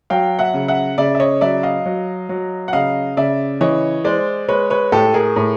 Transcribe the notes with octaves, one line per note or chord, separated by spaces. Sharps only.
F#3 F5 G5
E5 F#5
C#3
E5 F#5
C#3 D5 E5
E5
C#5 D#5
F#3 D5 E5
D#5 F5
F#3
F#3
F#5
C#3 D#5 F5
C#3 D5 E5
E3 C#5 D#5
G#3 C5 D5
G#3 B4 C#5
B4 C#5
A2 G4 A4
G#4 A#4
A2